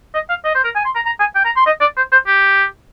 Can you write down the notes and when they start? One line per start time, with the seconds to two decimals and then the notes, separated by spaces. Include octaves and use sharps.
0.14 D#5
0.29 F5
0.45 D#5
0.55 C5
0.64 A#4
0.76 G#5
0.85 C6
0.95 A#5
1.06 A#5
1.20 G#5
1.35 G5
1.45 A#5
1.56 C6
1.66 D#5
1.81 D5
1.97 C5
2.12 C5
2.27 G4